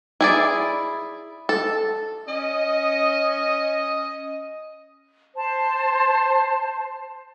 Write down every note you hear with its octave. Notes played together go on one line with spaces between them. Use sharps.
E4 G#4 D5
A4
C#4 D#5
C5 A5